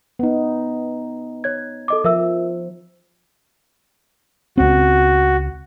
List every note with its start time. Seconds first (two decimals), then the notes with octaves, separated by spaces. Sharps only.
0.19 B3 D#4
1.44 C#5 G#6
1.88 A4 D#5 D6
2.04 F3 A#4 E5 E6
4.57 C#2 C4 F#4